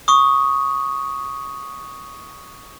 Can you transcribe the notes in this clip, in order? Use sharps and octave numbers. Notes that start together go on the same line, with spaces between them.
C#6 D#6